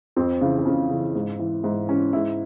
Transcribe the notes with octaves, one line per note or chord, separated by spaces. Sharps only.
F2 C4
C#3 E3
C4
F2 C#4
C#3 E3
G#2
E3
G#2 E4
E3 C#4
G#2 E4